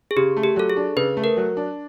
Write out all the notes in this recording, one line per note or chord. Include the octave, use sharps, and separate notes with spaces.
G#4
C#3 G4
A3
G4
F#3 A4
G#4
D4
C#3 B4
A3
A#4
F#3
D4